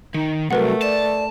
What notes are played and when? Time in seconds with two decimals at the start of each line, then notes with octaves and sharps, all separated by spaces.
0.14 D#3 D#4
0.51 C2 F#3 A3 A#4 B4 F#5
0.82 D5 A5